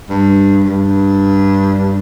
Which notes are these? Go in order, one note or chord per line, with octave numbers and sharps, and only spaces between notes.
G2
G2